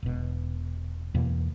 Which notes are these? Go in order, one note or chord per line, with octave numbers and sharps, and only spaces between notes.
E1 B2
E2 B2 E3 A#3